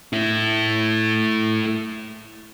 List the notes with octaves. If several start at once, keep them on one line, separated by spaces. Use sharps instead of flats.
A3 E4